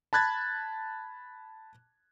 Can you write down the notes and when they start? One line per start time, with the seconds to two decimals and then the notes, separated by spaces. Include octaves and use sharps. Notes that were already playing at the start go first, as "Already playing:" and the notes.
0.13 A5 B5 F#6 G#6 A6